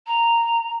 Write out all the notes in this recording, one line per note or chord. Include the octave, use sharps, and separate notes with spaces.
A#5